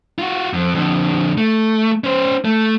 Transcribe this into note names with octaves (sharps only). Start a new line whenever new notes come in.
F4 F#4
F2
F2 D3
A3
C#4 C5
A3